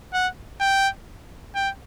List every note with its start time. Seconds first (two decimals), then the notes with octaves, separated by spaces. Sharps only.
0.13 F#5
0.60 G5
1.55 G5